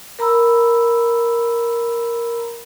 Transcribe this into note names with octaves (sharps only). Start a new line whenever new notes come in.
A#4 A#5 B5 E6